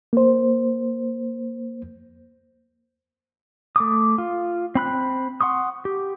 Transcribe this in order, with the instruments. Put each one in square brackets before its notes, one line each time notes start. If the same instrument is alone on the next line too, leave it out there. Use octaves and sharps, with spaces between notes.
[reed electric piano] A#3 C5
[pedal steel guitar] A3 D6 D#6
F4
C4 B5 F#6
F#5 C6 C#6 D#6
G4